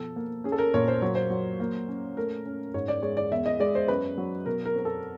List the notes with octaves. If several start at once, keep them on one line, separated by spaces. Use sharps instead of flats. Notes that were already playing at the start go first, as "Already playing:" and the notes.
Already playing: B2 F3 A4
A#3
C#4 G#4
A4
A#4
A#2 C#5
C5
F#3 C#5
C5
F#3
A#3
C#4
A3 A#4
C#4
G#2 C#5
D5
G#3 C#5
D5
E2 E5
D#5
G#3 D5
C5
F#2 B4
F#3
B2 A#4
A#4
C4 A#4
A4